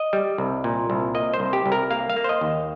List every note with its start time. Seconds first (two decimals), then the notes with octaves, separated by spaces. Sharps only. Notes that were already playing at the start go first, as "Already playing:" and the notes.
Already playing: D#5
0.13 G3
0.38 C2
0.64 A#2
0.90 C2
1.15 A#3 D#5
1.34 C5
1.40 C2
1.53 G4
1.66 C2
1.72 A#4
1.91 A#3 F5
2.10 F5
2.16 A#3
2.24 C5
2.29 D#5
2.41 D#2